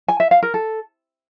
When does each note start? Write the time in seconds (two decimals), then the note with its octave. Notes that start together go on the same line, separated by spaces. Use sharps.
0.08 G#5
0.20 E5
0.31 F5
0.43 A#4
0.54 A4